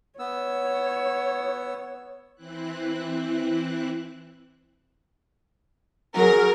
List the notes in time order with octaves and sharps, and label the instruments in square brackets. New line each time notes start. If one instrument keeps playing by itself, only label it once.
[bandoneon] B3 E6 [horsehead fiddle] C#5
[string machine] E3 C4 E4 F#6
[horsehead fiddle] F#3 G#4 [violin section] A#4